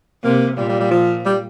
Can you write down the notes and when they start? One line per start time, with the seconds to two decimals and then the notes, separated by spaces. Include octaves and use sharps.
0.24 C3 A#3
0.57 A#2 G3
0.69 G3
0.80 G3
0.91 F3
1.26 G3